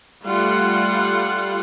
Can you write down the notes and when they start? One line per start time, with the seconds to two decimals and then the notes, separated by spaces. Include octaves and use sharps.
0.25 G3 A3 F4 F#5